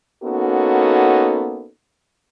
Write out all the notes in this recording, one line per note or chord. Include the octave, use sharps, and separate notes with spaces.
A#3 B3 C#4 D#4 F#4 A4